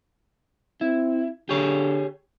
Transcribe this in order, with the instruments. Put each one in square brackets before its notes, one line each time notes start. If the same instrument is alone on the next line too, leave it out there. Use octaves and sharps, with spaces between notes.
[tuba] C4 [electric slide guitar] E4
[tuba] D3 [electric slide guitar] G4 G#4 C#5